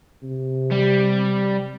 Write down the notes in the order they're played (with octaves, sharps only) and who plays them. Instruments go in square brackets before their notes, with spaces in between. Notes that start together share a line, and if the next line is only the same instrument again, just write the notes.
[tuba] C3
[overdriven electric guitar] G3